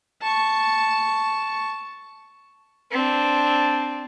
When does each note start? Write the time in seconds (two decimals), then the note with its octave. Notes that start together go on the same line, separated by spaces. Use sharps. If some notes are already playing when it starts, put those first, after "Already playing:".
0.22 A5 C#6
2.92 C4 D4